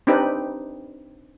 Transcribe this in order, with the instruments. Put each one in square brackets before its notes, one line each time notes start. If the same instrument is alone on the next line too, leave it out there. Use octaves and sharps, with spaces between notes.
[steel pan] C4 D4 D#4 G4 B4